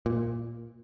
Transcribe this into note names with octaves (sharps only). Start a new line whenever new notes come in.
A#2